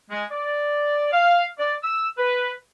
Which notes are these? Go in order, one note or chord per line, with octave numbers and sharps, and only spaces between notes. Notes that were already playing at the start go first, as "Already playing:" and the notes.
G#3
D5
F5
D5
E6
B4